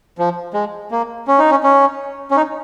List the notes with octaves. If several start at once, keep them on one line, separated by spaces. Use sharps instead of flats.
F3
G#3
A#3
C#4
D#4
C#4
C#4
C#4
D#4